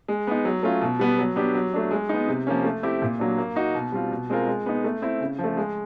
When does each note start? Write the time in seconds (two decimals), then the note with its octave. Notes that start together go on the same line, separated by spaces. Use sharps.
0.08 G#3
0.27 B3 D#4
0.45 F#3
0.63 A3 C#4 F4
0.81 B2
0.99 G3 B3
1.18 F#3
1.36 B3 D4 G4
1.55 F#3
1.74 A3 D4
1.91 G#3
2.09 B3 D#4
2.27 C3
2.47 F3 A#3 C#4
2.64 A3
2.83 C4 E4 G4
3.02 A#2
3.19 F#3 A#3 D4
3.38 A#3
3.56 D#4 F#4
3.74 B2
3.92 G3 C4 F4
4.11 B2
4.30 G#3 C4 F4 A#4
4.47 G#3
4.66 B3 D#4
4.84 A3
5.02 C4 E4
5.20 C#3
5.39 F3
5.44 A3
5.57 G#3